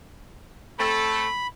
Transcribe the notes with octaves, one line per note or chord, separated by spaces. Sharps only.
A3 C4 A4 B5